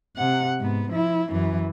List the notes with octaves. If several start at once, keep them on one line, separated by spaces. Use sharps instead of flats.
C3 F#5
G#2 B3
F3 E4
F#2 E3